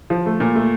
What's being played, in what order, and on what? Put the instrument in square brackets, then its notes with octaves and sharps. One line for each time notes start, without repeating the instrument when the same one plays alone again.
[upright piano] F3
A3
A#2
A3